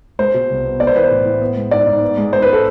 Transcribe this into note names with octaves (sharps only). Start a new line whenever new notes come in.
G#3 C5
B2
C2
B3
B3 D5
C5
E3 B4
C5
A2
A2
B3
G#3
G#2 D5
G#2
B3
G#3
G#2 C5
B4
A4